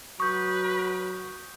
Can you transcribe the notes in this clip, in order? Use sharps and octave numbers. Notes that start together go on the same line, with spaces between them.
F#3 B4 C#6 D#6 G6